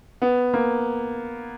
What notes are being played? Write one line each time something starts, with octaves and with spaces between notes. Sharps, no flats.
B3
A#3